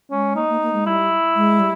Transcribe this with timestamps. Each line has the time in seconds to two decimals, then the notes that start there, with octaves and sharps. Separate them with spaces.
0.11 G#3 C#4
0.36 A#3 D#4
0.49 A#3
0.61 A#3
0.73 G#3
0.86 G3 E4
1.36 G#3
1.60 G3